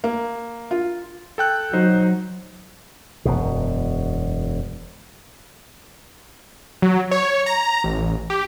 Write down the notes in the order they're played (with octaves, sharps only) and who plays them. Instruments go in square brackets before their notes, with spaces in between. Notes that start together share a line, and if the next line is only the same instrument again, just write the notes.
[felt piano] A#3
F4
[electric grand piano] A4 G5 F#6
[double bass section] F#3 [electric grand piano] D#4 C5
[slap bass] E1 F#2 B2
[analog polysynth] F#3
C#5
A#5
A1
G4